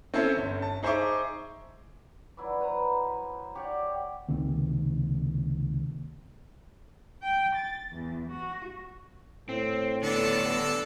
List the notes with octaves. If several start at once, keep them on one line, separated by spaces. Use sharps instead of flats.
C4 C#4 E4 A4 C#5
G1 C#4
A5
D#4 G#4 C5 E5 C#6 D6
F#3 E4 B4 D5
B4 C5 A#5
G4 C#5 D5 F#5
C#2 C3 D#3 A#3
G5
A6
E2
F#4
A2 C4
D3 B3 D4 A4